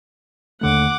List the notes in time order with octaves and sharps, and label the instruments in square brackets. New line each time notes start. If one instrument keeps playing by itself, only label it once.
[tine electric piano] D#2 D3 A3 [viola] F#5 D6